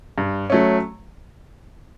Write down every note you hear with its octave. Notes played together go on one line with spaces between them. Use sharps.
G2
F#3 A3 C#4